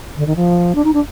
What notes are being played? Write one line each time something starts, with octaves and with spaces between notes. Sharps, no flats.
D3
D#3
F3
D4
D#4
D4